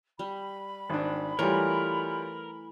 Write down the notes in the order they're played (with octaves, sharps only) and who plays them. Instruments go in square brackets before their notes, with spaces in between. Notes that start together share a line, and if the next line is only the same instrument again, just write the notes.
[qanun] G3 [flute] B5
[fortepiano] G#1 D4
[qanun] E3 A3 [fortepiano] G3 F4 C#5 [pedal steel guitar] A#4